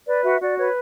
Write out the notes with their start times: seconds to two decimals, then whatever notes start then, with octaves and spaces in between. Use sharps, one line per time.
0.07 B4 D5
0.24 F#4 E5
0.41 F#4 D5
0.58 B4 C#5